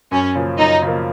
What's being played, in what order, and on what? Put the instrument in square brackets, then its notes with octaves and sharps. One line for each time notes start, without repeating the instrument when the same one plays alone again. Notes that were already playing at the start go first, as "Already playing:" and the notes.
[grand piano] F#2 [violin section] C#4
[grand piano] C#3 F3 A#3
[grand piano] F#2 [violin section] D#4
[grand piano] C#3 F3 A#3